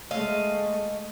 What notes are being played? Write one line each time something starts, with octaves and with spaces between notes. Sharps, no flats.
G#3 A3 D#5 F5